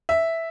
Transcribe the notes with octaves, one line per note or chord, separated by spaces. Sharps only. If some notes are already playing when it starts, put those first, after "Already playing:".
E5